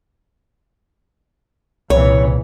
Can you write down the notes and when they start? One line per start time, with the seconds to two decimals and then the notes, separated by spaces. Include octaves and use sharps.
1.90 C2 A#2 C#3 E3 C#5